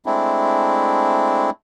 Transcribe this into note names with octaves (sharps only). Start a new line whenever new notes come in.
G#3 A3 C4 D4 E4